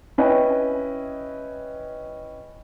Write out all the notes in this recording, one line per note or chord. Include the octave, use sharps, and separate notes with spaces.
C#4 E4 B4 D#5 G5 G#5